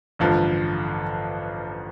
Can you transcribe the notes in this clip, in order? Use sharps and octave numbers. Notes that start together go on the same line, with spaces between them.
A1 G2 D3 F3